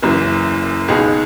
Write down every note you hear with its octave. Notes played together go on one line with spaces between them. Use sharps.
F#1 F#2 E3
C#2 B2 G#3 D#4 G#4